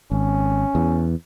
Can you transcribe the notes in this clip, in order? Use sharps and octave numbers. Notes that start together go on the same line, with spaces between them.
G#1 C#4
E2